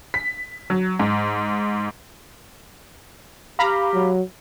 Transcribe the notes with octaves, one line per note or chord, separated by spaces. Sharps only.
B6
F#3
G#2
G4 F5 A#5 B5
F#3